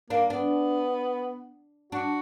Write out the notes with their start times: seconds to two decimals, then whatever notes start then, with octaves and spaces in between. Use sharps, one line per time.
0.10 A#3 D4
0.30 B3 D4
1.92 D4 F#4